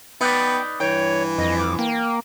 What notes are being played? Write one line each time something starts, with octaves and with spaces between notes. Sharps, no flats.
B3 D#4 B4 D5 G5
G2 E3 C#5 G5
F2 D#5
D6
A#3 G5